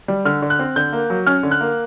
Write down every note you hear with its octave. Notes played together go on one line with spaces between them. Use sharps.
G3
D3 F6
D3
F#6
C4
D3 G6
A#3
F#3
C#4 F6
D3
F#6
A#3